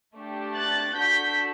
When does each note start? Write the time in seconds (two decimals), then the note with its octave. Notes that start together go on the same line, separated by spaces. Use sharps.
0.16 A3 D4 G4
0.56 F#6 A6
0.96 D4 F#4 A4 G6 B6